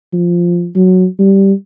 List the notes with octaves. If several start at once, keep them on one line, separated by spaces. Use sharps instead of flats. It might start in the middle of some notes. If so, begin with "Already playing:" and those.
F3
F#3
G3